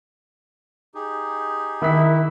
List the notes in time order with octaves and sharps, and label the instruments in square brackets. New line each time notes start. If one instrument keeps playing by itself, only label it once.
[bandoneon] D#4 G4 G#4
[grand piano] D#3 F#6 B6 [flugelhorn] E4